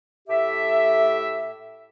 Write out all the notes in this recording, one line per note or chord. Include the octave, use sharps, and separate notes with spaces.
A2 A3 G4 E5